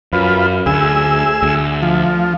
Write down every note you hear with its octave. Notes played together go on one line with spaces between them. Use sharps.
F#2 F4 B4
D2 G#4 E6
D2
F3